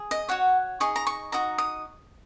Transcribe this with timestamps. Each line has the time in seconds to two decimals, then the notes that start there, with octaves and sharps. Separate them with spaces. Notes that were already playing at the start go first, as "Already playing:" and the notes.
Already playing: G#4
0.11 D#5
0.29 F#4 C#5 F#5
0.80 D#4 G#4 D#5 C#6
0.96 A#5
1.07 C#6
1.32 D#4 F#4 D#5 A#5
1.58 D#6